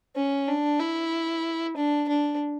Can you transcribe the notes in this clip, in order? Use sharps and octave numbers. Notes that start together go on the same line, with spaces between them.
C#4
D4
E4
D4
D4